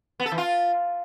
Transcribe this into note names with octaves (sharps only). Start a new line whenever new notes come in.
B3
A4
E3
F4